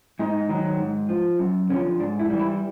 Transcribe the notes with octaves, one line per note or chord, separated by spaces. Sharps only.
G#2 D#4
D#3 F#3
G#2
F3
F#2
D3 F3 C#4
G#2 D4
E4
E3 G3
E4